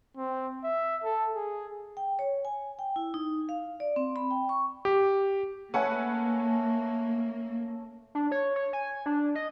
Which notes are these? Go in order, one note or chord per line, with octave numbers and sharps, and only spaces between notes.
C4
E5
A4
G#4
G5
C#5
G#5
G5
E4
D#4
F5
D5
C4
B5
G5
C#6
G4
A3 A#3 C#4 B4 F#5 G#5
D4
C#5
C#5
G#5
D4
D#5